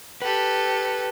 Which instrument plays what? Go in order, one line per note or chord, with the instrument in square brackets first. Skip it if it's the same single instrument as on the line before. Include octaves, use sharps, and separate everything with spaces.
[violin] G4 A4 [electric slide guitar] B4